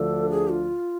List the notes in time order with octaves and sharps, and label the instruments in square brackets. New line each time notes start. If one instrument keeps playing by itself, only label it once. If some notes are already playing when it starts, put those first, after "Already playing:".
Already playing: [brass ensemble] D2 D3 F3 A3 D4 [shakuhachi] A4
[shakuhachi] G#4
F4